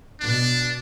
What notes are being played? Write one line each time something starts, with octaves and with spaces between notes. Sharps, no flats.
B2 D4